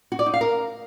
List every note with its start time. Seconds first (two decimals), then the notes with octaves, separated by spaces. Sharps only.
0.12 F#4
0.19 D5
0.26 D#4
0.34 F5
0.41 A#4